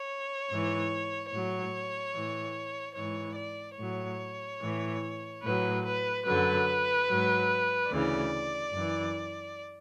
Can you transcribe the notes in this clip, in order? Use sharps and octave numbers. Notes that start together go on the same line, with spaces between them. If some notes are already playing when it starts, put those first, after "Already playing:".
Already playing: C#5
G#2 E3
A2 F#3 C#5
A2 E3
G#2 E3 C#5
D5
A2 F#3 C#5
A2 E3
A2 F#3 B4
B4
F#2 D3 F#3 B4
G#2 F#3
D2 C#3 E3 D5
F#2 E3